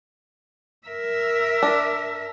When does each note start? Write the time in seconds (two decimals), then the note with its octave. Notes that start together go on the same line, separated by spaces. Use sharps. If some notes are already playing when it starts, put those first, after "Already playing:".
0.87 A#4 E5
1.63 D4